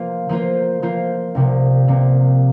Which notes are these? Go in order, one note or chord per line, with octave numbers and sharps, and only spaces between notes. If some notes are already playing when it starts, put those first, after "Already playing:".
Already playing: F3 A#3 F4
F3 A#3 F4 C5
F3 A#3 F4 C5
C2 C3 F3 A#3
C2 C3 F3 A#3